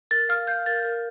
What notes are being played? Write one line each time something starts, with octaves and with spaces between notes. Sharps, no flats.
A#4 A6
F5 F6
F5 G6
A#4 A6
A#4